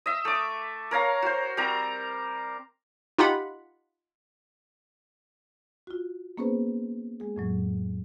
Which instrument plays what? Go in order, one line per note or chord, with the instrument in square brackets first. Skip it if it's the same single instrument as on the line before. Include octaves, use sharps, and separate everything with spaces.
[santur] D#5 E5
A3 D6
A#4 C#5 F5 A#5
F#4 C5
G3 C4 A#4 A#5
[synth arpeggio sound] D#4 F4 G4 F#5 B5
[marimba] F4 F#4
A#3 B3 C#4 G#4 B4 C5
G#3 G#4
F2 A2 F#3